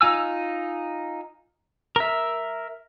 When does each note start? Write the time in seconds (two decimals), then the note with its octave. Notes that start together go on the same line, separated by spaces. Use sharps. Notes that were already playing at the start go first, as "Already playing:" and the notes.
0.01 D#4 F4 G#5 E6
1.96 A#4 E5